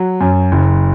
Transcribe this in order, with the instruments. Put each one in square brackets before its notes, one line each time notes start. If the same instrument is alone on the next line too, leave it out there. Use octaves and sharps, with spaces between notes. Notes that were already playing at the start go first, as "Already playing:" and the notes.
Already playing: [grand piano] F#3
F#2
F#1